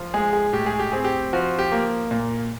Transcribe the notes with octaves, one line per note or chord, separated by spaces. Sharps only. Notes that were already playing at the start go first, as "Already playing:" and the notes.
Already playing: F3
G#3 G#4
G#4
A2 G4
G#4
G4
C4 G#4
G4
F3 F#4
G4
A#3
A#2